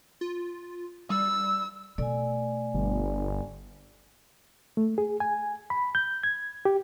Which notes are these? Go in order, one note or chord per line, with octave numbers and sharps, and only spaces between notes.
F4
G3 E6
B2 A3 D5 G#5
G1
A3
G#4
G#5
B5
G6
G#6
G4